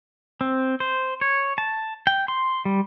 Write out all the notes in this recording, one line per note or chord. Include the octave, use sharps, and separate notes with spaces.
C4
C5
C#5
A5
G5
C6
G3